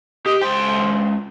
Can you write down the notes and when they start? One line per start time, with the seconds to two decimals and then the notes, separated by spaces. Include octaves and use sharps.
0.26 G4 D#5
0.42 C#2 C5 G5